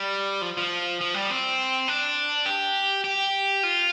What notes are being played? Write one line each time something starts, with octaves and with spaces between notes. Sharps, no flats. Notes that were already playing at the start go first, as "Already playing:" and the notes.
Already playing: G3
F3
F3
F3
G3
C4
D4
G4
G4
F4